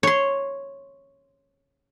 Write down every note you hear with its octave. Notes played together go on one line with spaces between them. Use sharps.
C#5 C6